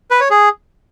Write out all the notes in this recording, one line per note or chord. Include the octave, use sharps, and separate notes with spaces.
B4
C#5
G#4